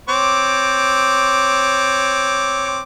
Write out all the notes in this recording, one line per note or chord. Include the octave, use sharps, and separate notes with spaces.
C4 C#5 D6